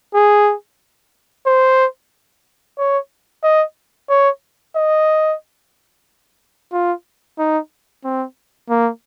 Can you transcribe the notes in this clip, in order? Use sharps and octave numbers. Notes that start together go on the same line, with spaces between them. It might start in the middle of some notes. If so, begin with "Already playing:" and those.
G#4
C5
C#5
D#5
C#5
D#5
F4
D#4
C4
A#3